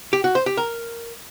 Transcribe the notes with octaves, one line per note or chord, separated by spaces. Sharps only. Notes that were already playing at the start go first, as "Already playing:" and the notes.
G4
F#4
C5
G4
A#4